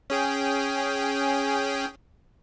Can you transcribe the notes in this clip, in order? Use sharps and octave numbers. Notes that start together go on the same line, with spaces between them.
C#4 G#4 G5